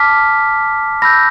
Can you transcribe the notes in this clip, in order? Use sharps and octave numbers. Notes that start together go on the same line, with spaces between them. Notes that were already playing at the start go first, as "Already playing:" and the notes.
Already playing: A5 D6 F6 B6
B5 E6 G6 A#6